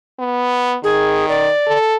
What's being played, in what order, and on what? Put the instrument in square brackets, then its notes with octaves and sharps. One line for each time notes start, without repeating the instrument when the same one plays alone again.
[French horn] B3
[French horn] D#3 [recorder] G#4
[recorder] D5
[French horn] A4